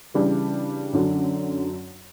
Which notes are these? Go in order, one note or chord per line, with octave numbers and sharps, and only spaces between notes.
C#3 E3 G3 D4
F#2 D3 F#3